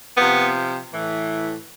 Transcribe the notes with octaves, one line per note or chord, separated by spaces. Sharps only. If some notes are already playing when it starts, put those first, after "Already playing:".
C3 F3 B3
A2 E3